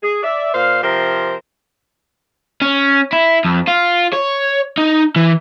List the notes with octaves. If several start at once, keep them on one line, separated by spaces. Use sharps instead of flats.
G#4
D5 E5
A#2 C5 F5
C3 F3 G4 A#4 C5
C#4
E4
F2
F4
C#5
D#4
E3